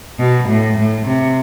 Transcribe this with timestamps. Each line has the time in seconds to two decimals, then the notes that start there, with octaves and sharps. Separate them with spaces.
0.19 B2
0.49 A2
0.78 A2
1.07 C3